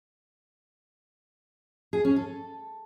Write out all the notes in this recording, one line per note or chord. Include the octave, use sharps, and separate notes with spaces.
G#4
C#4
A4